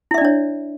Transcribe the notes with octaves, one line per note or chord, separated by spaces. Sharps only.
D4 E4 C#5 D5 E5